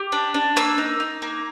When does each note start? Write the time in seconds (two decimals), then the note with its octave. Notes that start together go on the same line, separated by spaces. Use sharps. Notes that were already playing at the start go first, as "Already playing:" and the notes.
Already playing: G4
0.12 D4
0.34 D4
0.56 A#3 E6
0.78 D#4
1.00 D#4
1.22 A#3